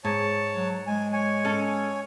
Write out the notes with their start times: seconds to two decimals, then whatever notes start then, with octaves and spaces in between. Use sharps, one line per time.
0.05 G#2 C#5 A5
0.55 F#3
0.87 G#3 G#5
1.13 C#5 G#5
1.45 C#4 A4